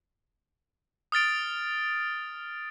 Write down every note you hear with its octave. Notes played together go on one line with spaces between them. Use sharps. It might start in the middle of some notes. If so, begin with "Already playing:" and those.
D#6 F6 A6 D7